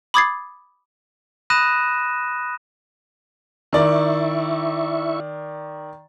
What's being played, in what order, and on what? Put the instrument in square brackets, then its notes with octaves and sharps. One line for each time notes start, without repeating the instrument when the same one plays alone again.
[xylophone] B5 D6 D#6 G#6 A6 C7
[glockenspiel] B5 D#6 F#6 A#6 D#7 E7
[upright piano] D#3 D5 [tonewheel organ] E4 E5 C#6